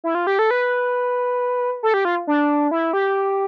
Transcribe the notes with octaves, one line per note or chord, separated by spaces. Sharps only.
E4
F4
G4
A4
B4
A4
G4
F4
D4
E4
G4